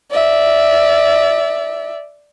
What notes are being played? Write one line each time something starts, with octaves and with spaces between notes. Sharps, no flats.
D5 E5